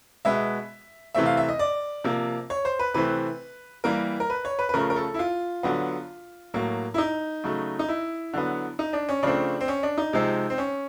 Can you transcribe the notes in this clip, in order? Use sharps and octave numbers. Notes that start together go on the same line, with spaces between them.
B2 G#3 B3 E5
C3 E3 A3 C4 E5
F5
E5
D#5
D5
C3 F3 A#3
C#5
C5
B4
C3 E3 A3 C4 B4
E3 G3 A#3 A#4
A#4
B4
C#5
B4
B4
C#3 F3 A3 A#4
A#4
A4
E4
F4
D3 F#3 B3
A2 F#3 A#3
E4
D#4
C#3 F#3 A3
D#4
E4
D3 F#3 B3
D#4
D4
C#4
C#3 F3 A3 C4 D4
C4
C#4
D4
D#4
C3 F3 G#3 C4
C4
C#4